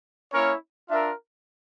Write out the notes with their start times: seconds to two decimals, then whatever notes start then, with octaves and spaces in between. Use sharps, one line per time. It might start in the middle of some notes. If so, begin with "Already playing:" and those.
0.33 A#3 C#4 E4 A#4 C#5
0.89 D4 F4 A#4 E5